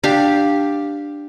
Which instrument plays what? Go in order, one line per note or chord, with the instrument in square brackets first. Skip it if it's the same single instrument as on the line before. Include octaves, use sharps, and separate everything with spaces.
[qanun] D4 G4 F5